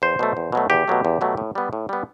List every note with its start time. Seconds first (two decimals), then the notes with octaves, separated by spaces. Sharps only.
0.02 E2 C5
0.19 B2 F#3 A3
0.37 E2
0.52 B2 F#3 A3
0.70 E2 G4
0.88 B2 F#3 A3
1.05 E2
1.21 B2 F#3 A3
1.37 A2
1.55 G3 B3
1.73 A2
1.89 G3 B3